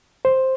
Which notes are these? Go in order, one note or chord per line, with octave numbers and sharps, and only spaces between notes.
C5